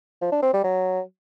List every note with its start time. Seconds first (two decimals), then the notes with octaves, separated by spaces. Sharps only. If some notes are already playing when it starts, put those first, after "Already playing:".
0.21 F3
0.32 D4
0.43 C4
0.53 G3
0.64 F#3